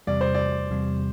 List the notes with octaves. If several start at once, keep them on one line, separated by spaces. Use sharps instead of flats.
E2 C3 G3 D5
C5
D5
E2 C3 G3